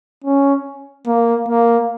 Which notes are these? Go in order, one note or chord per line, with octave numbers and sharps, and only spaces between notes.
C#4
A#3
A#3